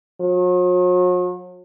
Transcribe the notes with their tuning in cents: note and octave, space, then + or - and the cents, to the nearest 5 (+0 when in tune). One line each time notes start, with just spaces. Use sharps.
F#3 -45